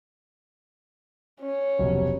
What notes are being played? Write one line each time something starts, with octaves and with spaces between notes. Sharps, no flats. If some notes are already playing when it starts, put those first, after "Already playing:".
C#4
F1 B1